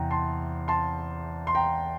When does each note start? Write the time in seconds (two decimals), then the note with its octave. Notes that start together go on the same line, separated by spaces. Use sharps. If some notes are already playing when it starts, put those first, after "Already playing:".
Already playing: E2 C3 G5 A#5
0.10 A5 C6
0.68 A5 C6
1.47 C6
1.55 G5 A#5